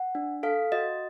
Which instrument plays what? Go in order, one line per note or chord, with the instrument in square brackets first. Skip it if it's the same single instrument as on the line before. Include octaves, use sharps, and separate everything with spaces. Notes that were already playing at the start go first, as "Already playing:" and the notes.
Already playing: [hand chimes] F#5
D4
A4 F5
F#4 D#5